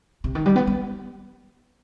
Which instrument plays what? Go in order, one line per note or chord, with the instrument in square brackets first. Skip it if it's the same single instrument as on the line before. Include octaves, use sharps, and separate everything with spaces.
[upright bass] C3
D#3
G3
B3
B3